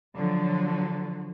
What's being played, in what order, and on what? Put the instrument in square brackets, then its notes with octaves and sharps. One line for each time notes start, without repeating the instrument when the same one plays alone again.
[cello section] D3 F3 F#3